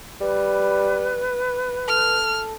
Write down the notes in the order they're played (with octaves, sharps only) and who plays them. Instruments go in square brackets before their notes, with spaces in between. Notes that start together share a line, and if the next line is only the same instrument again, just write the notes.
[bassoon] G3 [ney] B4
[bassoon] A4 [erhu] F6